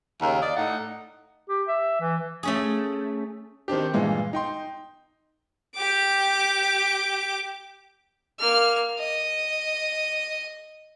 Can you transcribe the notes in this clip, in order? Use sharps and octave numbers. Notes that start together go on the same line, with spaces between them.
D#2 C#3 A#3
D5 D#5 F5
A2 D#4 F#5
G4
E5
E3
A3 C#4 G#4
D#3 C4 D4 G4
G2 A#2 E3 G#3
D#4 G5 C6
G4 D6
A#3 F6
D#5